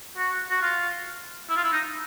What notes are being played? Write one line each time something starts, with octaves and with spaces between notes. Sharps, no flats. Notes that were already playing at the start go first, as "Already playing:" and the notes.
F#4
F#4
F4
E4
F4
E4
D#4